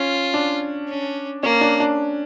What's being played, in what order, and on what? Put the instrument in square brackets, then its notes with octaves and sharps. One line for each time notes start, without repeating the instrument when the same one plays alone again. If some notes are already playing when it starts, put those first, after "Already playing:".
Already playing: [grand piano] C#4 [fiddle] F4
[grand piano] D4
[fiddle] C#4
[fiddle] A#3 [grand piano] C#4
[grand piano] D4
D4